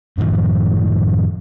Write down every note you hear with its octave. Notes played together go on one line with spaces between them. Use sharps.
F#2 A2 D#3 F3